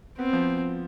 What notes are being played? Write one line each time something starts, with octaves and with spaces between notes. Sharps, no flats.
B3 C4
F3